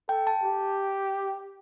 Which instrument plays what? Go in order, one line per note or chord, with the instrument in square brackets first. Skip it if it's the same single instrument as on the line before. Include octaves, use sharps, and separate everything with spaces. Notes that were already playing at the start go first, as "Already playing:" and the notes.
[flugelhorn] A4 [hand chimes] G5
[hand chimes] A5
[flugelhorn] G4